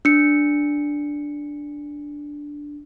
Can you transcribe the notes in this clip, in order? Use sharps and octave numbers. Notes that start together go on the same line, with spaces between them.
D4 C#7